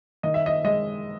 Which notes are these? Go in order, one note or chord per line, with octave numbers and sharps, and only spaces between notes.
D#3 D#5
E5
D#5
G#3 D#5